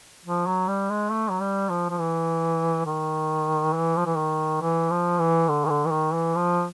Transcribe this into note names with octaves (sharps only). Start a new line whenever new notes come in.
F3
F#3
G3
G#3
A3
F#3
G3
F3
F3
E3
D#3
E3
F3
E3
D#3
E3
F3
E3
D3
D#3
D3
E3
D#3
E3
F3